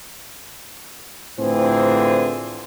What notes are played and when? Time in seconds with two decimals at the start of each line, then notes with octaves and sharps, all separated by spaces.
1.39 A2 D3 E3 F3 C4 G#4